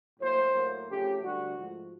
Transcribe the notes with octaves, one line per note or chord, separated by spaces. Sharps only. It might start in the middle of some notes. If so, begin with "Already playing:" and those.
A2 F#3 A#3 C5
A2 F#3 A#3
F2 C#3 F#3 A3 G4
D2 D3 G3 F#4
G#2 F3 A3